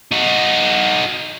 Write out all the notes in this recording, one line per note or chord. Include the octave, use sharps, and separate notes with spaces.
D#4 F#4